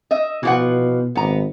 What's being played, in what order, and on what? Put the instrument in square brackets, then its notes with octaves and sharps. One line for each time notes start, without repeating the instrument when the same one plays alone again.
[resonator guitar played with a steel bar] D#5 E5
[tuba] B2 [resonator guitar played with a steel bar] E3 F3 F#5
[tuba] G#1 [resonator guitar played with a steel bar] B3 A#5